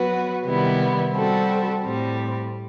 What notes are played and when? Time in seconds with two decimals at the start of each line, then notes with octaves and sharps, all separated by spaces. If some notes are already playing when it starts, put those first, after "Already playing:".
Already playing: F#3 B3 F#4 B4
0.45 C3 D#3 G3 B3 E4
1.13 G3 C4 F#4 A4
1.81 A2 G3 C4